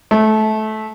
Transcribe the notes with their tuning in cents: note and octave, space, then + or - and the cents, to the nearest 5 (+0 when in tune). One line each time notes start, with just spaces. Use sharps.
A3 -20